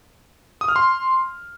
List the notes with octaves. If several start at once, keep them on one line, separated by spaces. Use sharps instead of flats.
D#6
F6
C6